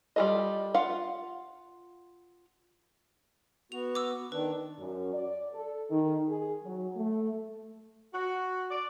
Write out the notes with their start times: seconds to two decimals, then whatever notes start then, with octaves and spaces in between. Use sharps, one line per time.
0.16 G3 F4 G#4 A4 D#5
0.75 F4 F5 F#5
3.72 B3 F#4 F7
3.95 D6 E6
4.32 D#3 D4 B4
4.79 F#2
5.13 D5
5.53 A4
5.90 D#3
6.28 G#4
6.64 F#3
6.96 A3
8.13 F#4
8.70 D5